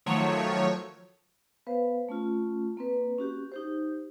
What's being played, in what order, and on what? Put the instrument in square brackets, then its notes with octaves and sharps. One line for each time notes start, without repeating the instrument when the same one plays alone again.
[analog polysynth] D#3 F3 F#3 A3 C#5
[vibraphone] B3 B4 C5 F5
A3 C#4 F4
A#3 C4 B4
C#4 F#4 G4
D#4 G4 C5